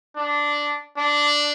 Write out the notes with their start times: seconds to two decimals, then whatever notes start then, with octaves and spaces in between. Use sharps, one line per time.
0.17 D4
0.98 D4